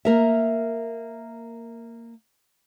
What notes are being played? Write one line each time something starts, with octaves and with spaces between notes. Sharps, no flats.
A#3 A#4 E5